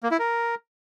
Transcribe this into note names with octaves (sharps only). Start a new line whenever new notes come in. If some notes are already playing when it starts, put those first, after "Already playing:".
A#3
E4
A#4